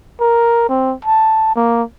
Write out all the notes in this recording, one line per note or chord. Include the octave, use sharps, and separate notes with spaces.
A#4
C4
A5
A#3